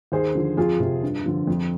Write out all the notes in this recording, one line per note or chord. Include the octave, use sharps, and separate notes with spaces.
D#2 G#4 C5
D3 F3
F2 F4 G#4
C3 F3
G2
D3 F3
F2